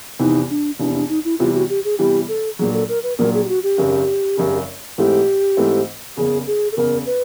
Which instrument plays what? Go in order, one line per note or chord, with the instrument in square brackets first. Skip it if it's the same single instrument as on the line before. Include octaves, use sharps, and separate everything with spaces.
[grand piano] F1 E2 C3 E3 [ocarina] D#4
[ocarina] D4
[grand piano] F1 E2 C3 E3 [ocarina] D4
[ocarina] D4
D#4
E4
[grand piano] E2 C3 E3 G3 [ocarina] F4
[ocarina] F#4
G4
G#4
[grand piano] E2 C3 E3 G3 [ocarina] G4
[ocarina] A4
[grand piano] A#1 A#2 F#3 [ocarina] G#4
[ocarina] A4
A#4
B4
[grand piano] A#1 A#2 F#3 [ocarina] A#4
[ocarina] G#4
G4
F#4
G4
[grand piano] G#1 F#2 C#3
G#1 F#2 C#3
[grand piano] G#2 E3 A3 C4 [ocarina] G4
[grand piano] G#2 E3 A3 C4
[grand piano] F#1 E2 C#3 [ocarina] G#4
[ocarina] G#4
A4
[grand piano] F#1 E2 C#3 [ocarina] A#4
[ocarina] B4